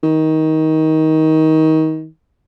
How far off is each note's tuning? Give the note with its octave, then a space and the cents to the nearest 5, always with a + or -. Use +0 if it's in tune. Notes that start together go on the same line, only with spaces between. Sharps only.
D#3 +20